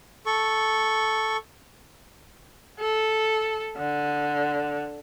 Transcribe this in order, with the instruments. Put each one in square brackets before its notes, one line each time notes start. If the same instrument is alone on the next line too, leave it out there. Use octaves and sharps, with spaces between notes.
[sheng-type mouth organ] A4 C#6
[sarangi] A4
D3